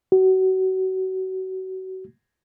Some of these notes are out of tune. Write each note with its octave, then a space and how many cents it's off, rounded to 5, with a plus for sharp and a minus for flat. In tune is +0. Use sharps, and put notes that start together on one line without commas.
F#4 +30